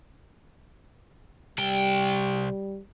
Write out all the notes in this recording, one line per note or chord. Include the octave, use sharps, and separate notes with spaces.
C2 G3 G5